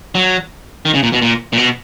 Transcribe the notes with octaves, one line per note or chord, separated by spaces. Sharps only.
F#3
D#3
C#3
A#2
B2
A#2
A#2
B2